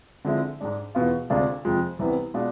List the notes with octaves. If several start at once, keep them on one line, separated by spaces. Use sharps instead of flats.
D3 F3 G#3 C4 E4
G#2 G#3 D4
E2 B2 B3 F4
D2 C3 G#3 D4 F4
F2 C3 F3 G#3
C2 C3 E3 B3
B2 G#3 D4 F4